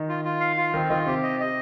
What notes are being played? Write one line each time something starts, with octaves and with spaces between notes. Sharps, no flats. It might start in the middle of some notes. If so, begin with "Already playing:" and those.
Already playing: D#3 D#4
F4
F4
F5
F4
D#3 C4 D#4
D#3 D#4 F4
C3 C4 G4
D#5
D#5